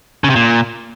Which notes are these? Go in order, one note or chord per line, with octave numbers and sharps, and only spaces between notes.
C#3
C3
A#2